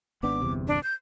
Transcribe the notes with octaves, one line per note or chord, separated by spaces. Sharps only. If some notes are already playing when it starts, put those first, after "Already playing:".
G#1 B3 D4 D6
G1 E2 C3
D4
G6